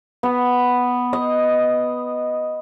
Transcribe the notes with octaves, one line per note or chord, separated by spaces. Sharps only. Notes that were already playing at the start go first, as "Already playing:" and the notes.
B3
D#5